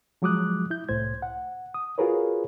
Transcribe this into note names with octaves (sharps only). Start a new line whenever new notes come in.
F3 F#3 G#3 D6 D#6 F#6
E4 G6
C2 A2 C5 G#6
F#5
D#6
F4 F#4 G#4 A#4 B4 C#5